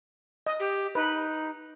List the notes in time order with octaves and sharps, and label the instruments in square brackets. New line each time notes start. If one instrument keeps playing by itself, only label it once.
[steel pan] D#5
[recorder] G4
[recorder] D#4 [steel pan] B4